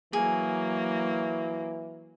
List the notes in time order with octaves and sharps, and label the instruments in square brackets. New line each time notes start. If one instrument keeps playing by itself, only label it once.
[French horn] E3 [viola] F#3 A#3 [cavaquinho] G#4